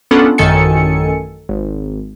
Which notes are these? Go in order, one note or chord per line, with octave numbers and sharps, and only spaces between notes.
B3 C#4 D4 F4 A4 F#5
A1 F#2 D#3 A4 G#5 C#7
G#1